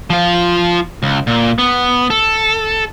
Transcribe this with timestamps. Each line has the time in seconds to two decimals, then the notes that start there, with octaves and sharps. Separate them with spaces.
0.10 F3 F4
1.03 C#2
1.27 A#2
1.59 B3
2.10 A4